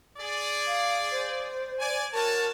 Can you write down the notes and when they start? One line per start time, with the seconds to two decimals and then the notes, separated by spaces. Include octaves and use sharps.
0.18 G#4 D5
0.67 F5
1.11 C5
1.79 D5 G#5
2.13 F#4 A#4 C#5 A5